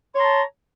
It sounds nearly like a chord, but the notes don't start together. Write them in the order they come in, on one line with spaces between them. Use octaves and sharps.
C#5 C6 A#5 A5